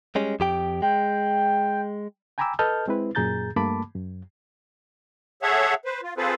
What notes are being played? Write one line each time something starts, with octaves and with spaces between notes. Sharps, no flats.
G3 G#3 C#4
F2 G4 G5
G#3 G5
G5 G#5 A#5 B5 D6 E6
A4 B4 D#5 A5 F6 G6
G#3 C4 E4 B4
F#2 A#2 G#4 A#5 G6 A6
G2 A3 A#3 A5 B5 D6
F#2
G#4 A4 C#5 E5 F#5
B4 C5
F4
C4 F4 G#4 A4 B4 C5